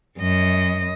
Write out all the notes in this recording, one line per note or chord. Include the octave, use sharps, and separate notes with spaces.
F#2 D#5